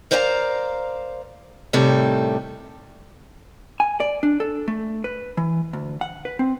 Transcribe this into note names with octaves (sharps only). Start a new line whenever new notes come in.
A#4 C5 D5 F5 G5 A#5
A2 C3 D#3 G3 A4
G#5
D5
D4
A4
A3
B4
E3
D2
F#5
B4
C4